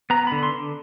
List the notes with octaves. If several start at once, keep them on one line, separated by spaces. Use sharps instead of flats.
B3 A#5
D3 B5
C6
D3